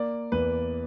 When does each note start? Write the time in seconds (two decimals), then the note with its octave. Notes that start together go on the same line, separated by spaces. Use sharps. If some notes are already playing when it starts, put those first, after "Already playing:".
Already playing: A#3 D5
0.32 E2 B4